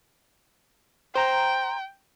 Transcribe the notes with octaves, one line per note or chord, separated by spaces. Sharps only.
C5 G5 A#5